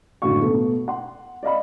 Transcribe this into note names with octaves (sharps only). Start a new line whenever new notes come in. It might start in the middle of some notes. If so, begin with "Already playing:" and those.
F#1 A2 D3 F#4 F5 C#6
B2 A3 B3 A4
F#5 C6
D5 D#5 F5 B5